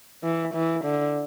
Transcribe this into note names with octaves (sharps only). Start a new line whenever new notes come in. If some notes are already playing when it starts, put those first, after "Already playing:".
E3
E3
D3